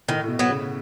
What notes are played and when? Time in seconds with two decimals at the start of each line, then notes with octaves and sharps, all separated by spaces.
0.08 A2 D#3
0.24 A2
0.28 B2
0.39 F#3 B3
0.49 C#3